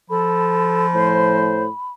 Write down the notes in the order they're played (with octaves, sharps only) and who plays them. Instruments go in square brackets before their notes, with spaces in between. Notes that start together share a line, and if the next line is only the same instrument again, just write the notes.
[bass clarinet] F3 [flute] A4 [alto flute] B5
[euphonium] A2 [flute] C5